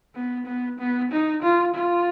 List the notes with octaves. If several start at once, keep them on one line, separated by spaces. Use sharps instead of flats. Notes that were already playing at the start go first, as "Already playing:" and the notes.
B3
B3
B3
D#4
F4
F4